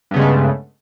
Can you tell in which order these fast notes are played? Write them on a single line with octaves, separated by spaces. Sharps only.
G2 B3 C#3 G#3 A3